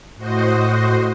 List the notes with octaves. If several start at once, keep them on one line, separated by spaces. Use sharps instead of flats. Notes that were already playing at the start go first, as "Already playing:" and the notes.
A2 F#4 C5 D#5